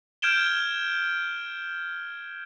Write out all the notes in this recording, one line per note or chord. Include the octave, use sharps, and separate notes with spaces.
F6 G6 G#6 D7 E7 G7